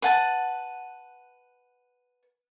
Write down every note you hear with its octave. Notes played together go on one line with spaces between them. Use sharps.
B4 F#5 A5